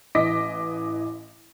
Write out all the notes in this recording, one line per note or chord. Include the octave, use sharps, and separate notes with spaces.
A1 E3 D#5 D6 A#6 B6